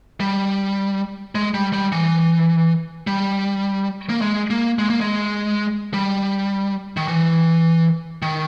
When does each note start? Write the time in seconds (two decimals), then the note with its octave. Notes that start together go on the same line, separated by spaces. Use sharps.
0.20 G3
1.35 G#3
1.54 G3
1.73 G3
1.92 E3
3.07 G3
4.09 A#3
4.21 G#3
4.50 A#3
4.79 G#3
4.90 A#3
5.01 G#3
5.94 G3
6.97 D#3
7.08 E3
8.22 D#3